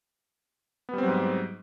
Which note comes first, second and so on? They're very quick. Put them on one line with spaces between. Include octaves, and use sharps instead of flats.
B3 G3 C4 F#3 G#2